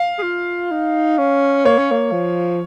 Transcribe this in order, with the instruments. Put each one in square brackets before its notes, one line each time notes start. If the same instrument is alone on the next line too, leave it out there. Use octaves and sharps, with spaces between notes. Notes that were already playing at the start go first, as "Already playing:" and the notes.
Already playing: [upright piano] F5
[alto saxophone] G#4
F4
D#4
C#4
[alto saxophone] A#3 [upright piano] C#5
[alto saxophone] C#4
A#3
F3